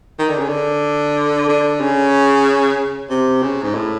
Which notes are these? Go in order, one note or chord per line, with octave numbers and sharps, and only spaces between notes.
D#3
D3
C#3
D3
D3
C#3
C3
C#3
G#2
A2